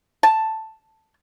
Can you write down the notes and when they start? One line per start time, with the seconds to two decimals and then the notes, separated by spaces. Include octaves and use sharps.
0.23 A5